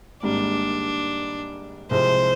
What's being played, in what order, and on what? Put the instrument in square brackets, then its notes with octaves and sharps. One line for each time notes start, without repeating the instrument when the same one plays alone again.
[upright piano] G#1 G#2 G3 A#3 [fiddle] D4
[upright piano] C2 C3 F3 G#3 [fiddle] C5